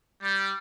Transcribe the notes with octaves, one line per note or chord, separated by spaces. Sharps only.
G3